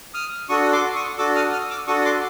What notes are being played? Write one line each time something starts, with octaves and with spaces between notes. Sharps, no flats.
D#6 F6
D4 F#4 A4 C#6 D#6
C6 D6
C#6 D#6
D4 F#4 A4 D6 E6
D#6 F6
D#6 F6
D6 E6
D4 F#4 A4 C#6 D#6
C6 D6